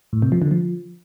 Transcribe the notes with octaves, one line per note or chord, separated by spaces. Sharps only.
A2
C3
F3
D3
F3